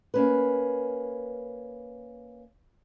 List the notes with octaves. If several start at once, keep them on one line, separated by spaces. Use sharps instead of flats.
A#3 C#4 B4